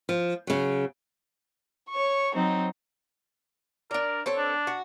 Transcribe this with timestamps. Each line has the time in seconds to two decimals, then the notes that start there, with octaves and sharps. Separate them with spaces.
0.09 F3
0.47 C#3 F#3
1.90 C#5 C#6
2.34 F#3 C4 D#4
3.91 D4 A#4 D5
4.26 C4 A4 C#5
4.37 D4
4.67 F#4